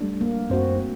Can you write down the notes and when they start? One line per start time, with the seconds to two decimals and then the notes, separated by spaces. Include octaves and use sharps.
0.01 G3 A3 D4
0.21 A#3
0.50 F#2 C4 F#4 C5